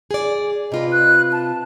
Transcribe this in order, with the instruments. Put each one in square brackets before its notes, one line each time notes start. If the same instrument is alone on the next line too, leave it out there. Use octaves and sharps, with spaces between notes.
[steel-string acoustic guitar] G#4 D5
[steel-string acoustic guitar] C3 F4 B4 [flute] D#5
[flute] F#6
A5